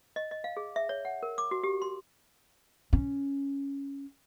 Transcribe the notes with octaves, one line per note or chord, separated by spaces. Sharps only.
D#5
D#5
F5
G#4
E5
C#5
F#5
A#4
D6
F#4
G4
C6
C#4